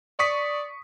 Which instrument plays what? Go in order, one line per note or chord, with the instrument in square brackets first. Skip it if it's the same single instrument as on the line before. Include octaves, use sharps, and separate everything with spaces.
[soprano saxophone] D5 [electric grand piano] C#6 D#6 B6